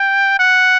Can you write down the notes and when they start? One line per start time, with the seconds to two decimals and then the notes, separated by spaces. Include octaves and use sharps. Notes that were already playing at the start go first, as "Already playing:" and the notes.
Already playing: G5
0.39 F#5